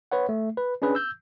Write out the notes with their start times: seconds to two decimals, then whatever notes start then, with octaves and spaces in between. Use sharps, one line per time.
0.12 B4 C#5 F#5
0.29 A3
0.57 B4
0.82 C#4 D4 G#4 B4
0.95 E6 G6